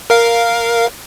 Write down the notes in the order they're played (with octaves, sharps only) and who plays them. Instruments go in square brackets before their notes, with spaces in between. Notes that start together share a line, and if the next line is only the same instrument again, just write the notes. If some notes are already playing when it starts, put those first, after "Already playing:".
[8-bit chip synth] A#4 F5